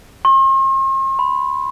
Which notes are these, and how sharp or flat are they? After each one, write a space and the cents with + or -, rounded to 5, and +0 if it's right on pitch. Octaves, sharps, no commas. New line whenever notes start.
C6 +45
B5 +25